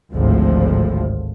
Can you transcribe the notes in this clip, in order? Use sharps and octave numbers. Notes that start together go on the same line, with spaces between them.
G#1 D2 A2 F3